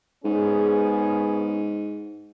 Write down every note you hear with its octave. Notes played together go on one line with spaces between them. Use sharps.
G#2 B3 C#4 G#4